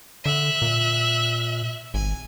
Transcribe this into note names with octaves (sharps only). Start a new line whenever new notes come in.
D3 E5 F#6
A#2
G#1 G#5